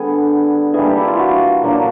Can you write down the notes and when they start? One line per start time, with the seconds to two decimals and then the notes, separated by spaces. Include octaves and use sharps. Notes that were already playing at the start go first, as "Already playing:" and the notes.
Already playing: D3 G3 B3 G#4
0.74 E3 G3 A#3 D4 G#4
0.86 G4
0.96 E4
1.07 F4
1.19 F#4
1.63 A#2 F#3 A#3 D4